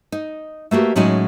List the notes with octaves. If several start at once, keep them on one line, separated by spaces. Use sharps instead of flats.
D#4
A3 A#3 F#4 G4
A2 F#3 G#3 C#4 D#4 G#5